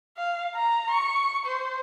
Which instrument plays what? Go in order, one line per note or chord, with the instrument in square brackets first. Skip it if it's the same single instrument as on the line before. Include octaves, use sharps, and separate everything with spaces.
[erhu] F5
A#5
C#6
C5